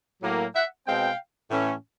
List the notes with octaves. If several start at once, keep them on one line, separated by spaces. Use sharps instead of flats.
A2 F#3 A#3
E5 F#5
B2 G#3 C4 F5 G5
A2 E3 A3 C#4